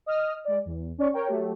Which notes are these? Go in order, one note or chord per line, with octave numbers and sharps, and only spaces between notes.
D#5 D#6 F6
G#3 D5
E2
C#4 D5 C#6
A#4 C#5 G5
F#3 A3 G4